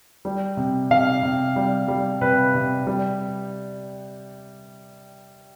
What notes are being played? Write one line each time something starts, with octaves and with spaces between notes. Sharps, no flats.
G3
C3
C3 F5
C3
G3
G3
C3 B4
C3
G3